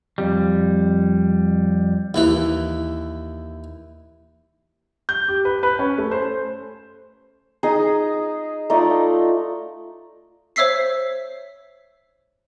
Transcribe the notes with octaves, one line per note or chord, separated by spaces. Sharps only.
F2 G3
D#2 E3 B4
G6
G4
B4
B4
C#4
A3
C5
D#4 G#4 D#5 D#6
A3 D#4 F4 D5
C5 C#5 E5 E6 B6 C7